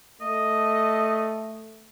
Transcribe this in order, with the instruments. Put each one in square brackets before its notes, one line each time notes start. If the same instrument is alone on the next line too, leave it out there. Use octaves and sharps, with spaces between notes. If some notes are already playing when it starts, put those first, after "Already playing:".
[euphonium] A3 [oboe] D#5